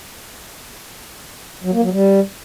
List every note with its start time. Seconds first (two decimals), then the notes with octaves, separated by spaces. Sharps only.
1.64 F#3
1.73 A#3
1.83 F#3
1.92 G3